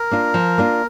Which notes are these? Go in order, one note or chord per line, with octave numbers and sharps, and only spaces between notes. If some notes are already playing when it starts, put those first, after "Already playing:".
Already playing: A#4
A#3 D4 F4
F3
A#3 D4 F4